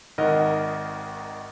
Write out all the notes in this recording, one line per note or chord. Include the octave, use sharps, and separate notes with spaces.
G#1 D#3 A#4 D#5 F#5 F6